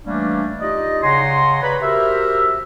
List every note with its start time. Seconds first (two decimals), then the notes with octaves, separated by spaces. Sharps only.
0.06 E3 G3 A3 A#3 C#4 D4
0.60 D#4 F4 G4 D5 D#5
1.03 C#3 C#5 F#5 G#5 A#5 C6
1.62 B4 C#5 D5 A#5 B5
1.82 F#4 G4 A#4 C5 E5